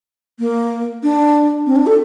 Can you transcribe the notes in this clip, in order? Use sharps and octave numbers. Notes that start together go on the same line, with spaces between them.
A#3
D4
C4
D4
A4